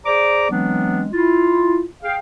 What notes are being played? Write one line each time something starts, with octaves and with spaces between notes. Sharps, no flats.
G#4 C5 D5 A#5 D6
E3 F#3 G#3 B3 C4 D4
E4 F4
G#4 F5 G5